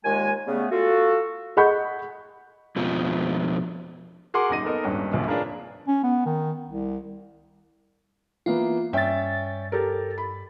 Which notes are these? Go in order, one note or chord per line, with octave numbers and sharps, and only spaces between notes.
D#2 A#2 G#3 G#5
C#3 G3 A3 B3
F4 F#4 A4
G#4 D#5 F#5 B5 C#6 G6
F2 B2 F3
F#4 G#4 A#4 F#5 C6 D6
D#1 F#2 D#4 A#6 D#7
B3 D#4 A4 A#4 D#5
D#1 G#1 G2 C#4
F1 A#1 D#2 C3 F3 F5
C#4 D4 F4 G#4 A#4 B4
C#4
B3
D#3
C2
E3 A#3 B3 F4
G2 C#4 E5 G5 A6
G4 A4 A#4
B5